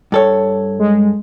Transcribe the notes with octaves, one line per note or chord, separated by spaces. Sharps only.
G2 A4 C#5
G#3